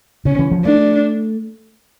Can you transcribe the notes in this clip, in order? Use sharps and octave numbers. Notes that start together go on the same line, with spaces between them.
C#3 C#4
E3
F3
A3 D4